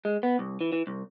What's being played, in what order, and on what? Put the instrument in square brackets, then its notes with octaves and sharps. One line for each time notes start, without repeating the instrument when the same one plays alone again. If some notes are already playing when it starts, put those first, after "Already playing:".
[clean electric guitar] G#3
B3
C2
E3
E3
C2